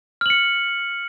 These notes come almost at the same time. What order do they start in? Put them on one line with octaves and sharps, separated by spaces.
F6 F#7 C#7